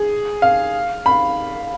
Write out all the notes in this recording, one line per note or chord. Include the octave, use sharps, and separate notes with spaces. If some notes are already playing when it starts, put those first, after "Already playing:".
Already playing: G#4
F5
B5